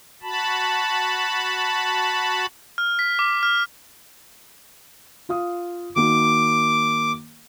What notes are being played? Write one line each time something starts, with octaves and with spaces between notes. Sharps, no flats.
F#4 A5 B5
F6
B6
D6
F6
F4 F5 D#6
D#3 A#3 F#4 D6